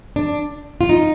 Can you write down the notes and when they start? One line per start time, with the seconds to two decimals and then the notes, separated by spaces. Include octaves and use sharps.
0.16 D4
0.81 F4
0.89 D#4